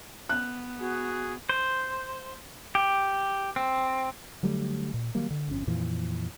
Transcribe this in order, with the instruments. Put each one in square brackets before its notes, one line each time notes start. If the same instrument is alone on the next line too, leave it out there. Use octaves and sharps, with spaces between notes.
[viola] B3 [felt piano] F#6
[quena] F#4 [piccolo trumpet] G#4
[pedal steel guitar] C5
G4
C4
[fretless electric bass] D3 F#3 G3 A3
A#2
D#3 F#3 G3 A#3
D3
G1 F2 C#4
F2 A#2 E3 F3